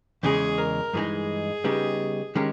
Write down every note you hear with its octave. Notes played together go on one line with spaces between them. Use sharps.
E2 C#3 G#3 G#4
A#4
G2 E3 G#3 D#4 G#4
C#3 G3 B3 D#4 G4
D#3 G#3 C#4 G4 A#4